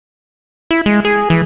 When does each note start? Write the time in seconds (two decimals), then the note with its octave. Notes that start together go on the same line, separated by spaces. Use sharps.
0.71 E4
0.86 G#3
1.05 G#4
1.30 E3